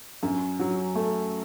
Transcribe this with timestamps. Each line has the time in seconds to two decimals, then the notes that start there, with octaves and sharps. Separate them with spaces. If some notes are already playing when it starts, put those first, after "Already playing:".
0.23 F#2
0.59 F#3
0.95 A3